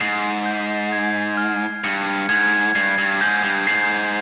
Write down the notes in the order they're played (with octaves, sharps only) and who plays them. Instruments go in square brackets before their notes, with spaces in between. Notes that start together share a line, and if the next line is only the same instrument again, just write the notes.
[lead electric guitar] G#2 [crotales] C7
[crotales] G6
G#6
F6
[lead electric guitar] G2 [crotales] C#7
[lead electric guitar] G#2 [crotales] G#6
[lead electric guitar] G2 [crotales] C7
[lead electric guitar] G2
[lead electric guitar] G#2 [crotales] G6
[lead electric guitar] G2
[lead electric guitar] G#2 [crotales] C7